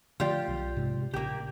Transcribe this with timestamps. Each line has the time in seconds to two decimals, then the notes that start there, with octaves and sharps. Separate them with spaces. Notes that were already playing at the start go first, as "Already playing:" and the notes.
0.20 D3 F3 A3 F4 G4 D5
0.48 B1
0.77 G#2 C3 G#3
1.13 A#1 C#3 A#3 G4